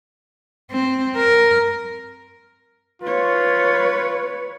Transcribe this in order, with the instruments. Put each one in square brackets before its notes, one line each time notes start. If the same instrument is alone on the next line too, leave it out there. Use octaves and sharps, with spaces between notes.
[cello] C4
A#4
[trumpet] F4 [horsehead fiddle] B4 C#5